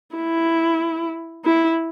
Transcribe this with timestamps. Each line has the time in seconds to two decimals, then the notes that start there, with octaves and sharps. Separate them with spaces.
0.16 E4
1.45 E4